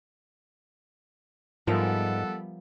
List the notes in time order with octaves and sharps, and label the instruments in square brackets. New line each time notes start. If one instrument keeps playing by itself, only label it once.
[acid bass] G#2 [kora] F3 A#4 E5 [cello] G3 B3 [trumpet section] A4 F#5